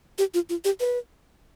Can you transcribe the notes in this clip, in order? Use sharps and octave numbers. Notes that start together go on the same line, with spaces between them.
G4
F4
F4
G4
B4